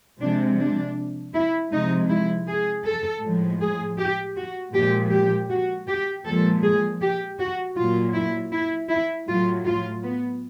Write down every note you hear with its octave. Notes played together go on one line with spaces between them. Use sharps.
C3 F3 G#3 D4
D4
E4
C3 F3 G#3 D#4
E4
G#4
A4
A2 F3 G#3
G#4
G4
F#4
A#2 F3 G#3 G4
G4
F#4
G4
A#2 F3 G#3 A4
G#4
G4
F#4
A#2 F#3 F4
E4
E4
E4
A2 F#3 F4
F4
B3